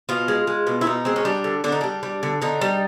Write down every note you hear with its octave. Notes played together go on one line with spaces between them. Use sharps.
B2 F4
G#3
G#3
B2
E4
B2 D#4
G#3 C4
C#4
G3 D4
D3
D3 D4
D#4
G3 D4
G3
D3
D3 D#4
G3